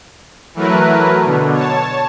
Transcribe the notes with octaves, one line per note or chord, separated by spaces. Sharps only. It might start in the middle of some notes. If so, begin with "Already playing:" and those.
E3 F#3 A3 A#4 B4
B2 D3
C#5 A5